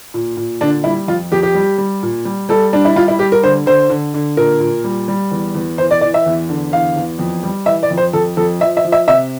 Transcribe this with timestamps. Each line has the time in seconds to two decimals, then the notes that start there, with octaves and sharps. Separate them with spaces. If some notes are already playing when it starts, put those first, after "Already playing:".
0.14 A#2
0.37 A#2
0.61 D3 D4
0.84 G3 E4
1.07 F2 F4
1.32 F2 G4
1.43 G4
1.54 G3
1.78 G3
2.03 A#2
2.25 G3
2.49 G3 A4
2.73 G3 D4
2.85 E4
2.96 G3 F4
3.08 E4
3.19 G3 G4
3.32 A#4
3.43 D3 C5
3.66 D3 C5
3.90 D3
4.14 D3
4.37 A#2 A#4
4.60 A#2
4.84 G3
5.08 G3
5.31 E2
5.54 E2
5.78 E3 C5
5.91 D5
6.01 E3 D5
6.14 E5
6.26 E2
6.49 D3
6.72 E2 F5
6.96 E2
7.19 F2
7.43 G3
7.66 E3 E5
7.83 D5
7.90 F2
7.97 C5
8.13 F2 A4
8.37 F2 A4
8.61 F3 E5
8.77 E5
8.84 F3
8.92 E5
9.08 C3 E5